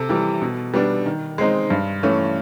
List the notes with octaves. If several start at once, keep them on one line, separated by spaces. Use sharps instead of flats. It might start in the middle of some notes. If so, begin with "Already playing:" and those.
Already playing: C3 A4
E3 G3
B2
G3 B3 D4
D#3
G#3 C4 D#4
G2
E3 A3 C#4